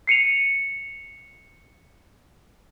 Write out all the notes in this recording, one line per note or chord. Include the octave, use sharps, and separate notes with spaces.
C7 C#7 D#7 F7